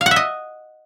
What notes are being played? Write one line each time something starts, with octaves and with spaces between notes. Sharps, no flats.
F5
F#5
E5
D#5